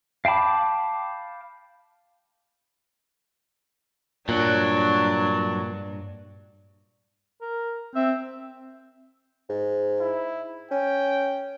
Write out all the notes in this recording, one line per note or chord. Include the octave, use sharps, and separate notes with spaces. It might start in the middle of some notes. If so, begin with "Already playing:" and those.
F5 G5 A5 B5 D6
G2 A#2 F#3 D4
A#4
C4 E5
G#2
E4
C#4 G5